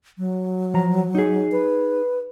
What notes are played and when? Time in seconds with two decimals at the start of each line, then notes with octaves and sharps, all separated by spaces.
0.18 F#3
0.74 F3 A#5
1.15 D#4 G#4
1.52 B4